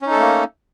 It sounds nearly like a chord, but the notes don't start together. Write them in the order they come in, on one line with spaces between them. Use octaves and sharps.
C#4 D#4 A4 A3 A#3